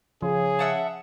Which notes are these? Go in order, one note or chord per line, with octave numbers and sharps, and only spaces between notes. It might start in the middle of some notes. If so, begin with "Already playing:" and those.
C#3 F3 G#4
E5 F#5 A5